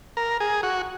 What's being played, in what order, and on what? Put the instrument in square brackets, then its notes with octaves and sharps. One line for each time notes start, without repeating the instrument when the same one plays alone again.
[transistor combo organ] A#4
G#4
F#4